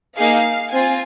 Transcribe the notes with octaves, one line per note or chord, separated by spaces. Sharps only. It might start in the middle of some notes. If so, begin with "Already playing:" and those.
A#3 D#4 G#4 F5
C4 F4 G#5